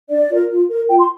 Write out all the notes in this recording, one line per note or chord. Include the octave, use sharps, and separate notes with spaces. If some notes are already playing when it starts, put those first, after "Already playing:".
D4 D5
F4 A#4
F4
A#4
F4 G5
C6